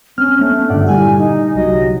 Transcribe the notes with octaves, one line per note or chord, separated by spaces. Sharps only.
C4 C#4 F6
A3 B3 C#4 D4
G2 A#2 D3 D5 F#5
G3 E4 G4 G#5
D#4
C2 F#3 D#5